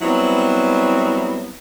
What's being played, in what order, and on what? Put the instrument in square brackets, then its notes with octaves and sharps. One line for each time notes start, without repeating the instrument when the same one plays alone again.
[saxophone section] F#3 G3 B3 C4 E4